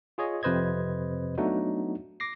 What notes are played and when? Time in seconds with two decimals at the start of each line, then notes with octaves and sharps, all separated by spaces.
0.18 F4 G#4 C#5 D#5
0.43 F2 C3 B4 C5 D#5 G#6
1.38 F#3 A3 B3 D4 D#4 F#4
2.20 D6 A#6 C7